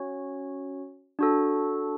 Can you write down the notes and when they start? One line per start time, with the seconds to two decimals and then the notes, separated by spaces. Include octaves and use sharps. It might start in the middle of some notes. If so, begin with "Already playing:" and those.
Already playing: C#4 F#4 C#5
1.19 D4 F#4 A4